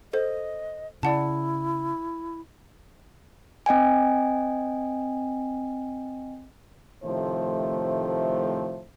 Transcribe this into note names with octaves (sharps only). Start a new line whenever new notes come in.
A4 C5 D#5
C#3 E4 D5 F#5 A5
C4 D#5 G5 G#5
A2 C3 D#3 F3 A3 C5